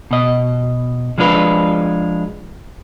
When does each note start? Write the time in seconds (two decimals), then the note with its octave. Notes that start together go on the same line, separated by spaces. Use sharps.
0.11 B2 D#5
1.18 F3 G#3 D4 F4 B4